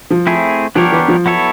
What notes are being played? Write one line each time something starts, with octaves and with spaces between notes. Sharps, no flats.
F3
A3 C4 E4 G#4
F3 B3 D4 G4 A#4 C#5
E3
F3
F#3 B3 E4 A4 C#5